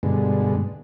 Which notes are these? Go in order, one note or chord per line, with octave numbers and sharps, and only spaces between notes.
G2 B2 D3 G#3